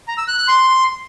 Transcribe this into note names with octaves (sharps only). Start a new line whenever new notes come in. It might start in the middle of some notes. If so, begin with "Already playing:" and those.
A#5
E6
F#6
F#6
C6